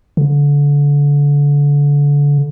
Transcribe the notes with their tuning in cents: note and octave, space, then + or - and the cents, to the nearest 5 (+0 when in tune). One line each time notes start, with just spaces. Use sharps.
D3 -30